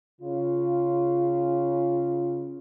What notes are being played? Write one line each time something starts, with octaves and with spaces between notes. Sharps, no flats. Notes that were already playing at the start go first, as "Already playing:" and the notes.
C#3 F4